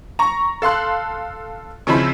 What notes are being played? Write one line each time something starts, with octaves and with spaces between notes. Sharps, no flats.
A#5 C#6
A4 F5 C6 F#6
C#3 F3 C4 D#4 E4 B5